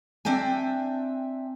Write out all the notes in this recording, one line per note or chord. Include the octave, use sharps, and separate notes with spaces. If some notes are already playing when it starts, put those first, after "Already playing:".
C4 D4 E5 G5 G#5